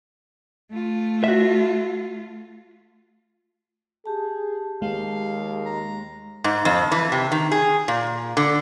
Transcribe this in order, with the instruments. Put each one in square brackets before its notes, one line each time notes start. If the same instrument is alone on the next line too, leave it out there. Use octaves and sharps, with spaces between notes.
[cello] A3 F4
[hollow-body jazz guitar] F#4 E5
[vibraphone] G4 A5 [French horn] G#4
[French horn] D#2 [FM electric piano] G#3 [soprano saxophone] F5
[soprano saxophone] A#5
[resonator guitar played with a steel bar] G#2
F2
E3
C3
D#3
G#4
A#2
D3